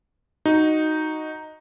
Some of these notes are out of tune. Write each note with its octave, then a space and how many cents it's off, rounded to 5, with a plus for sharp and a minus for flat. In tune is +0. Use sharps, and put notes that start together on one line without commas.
D#4 +0 F#4 +0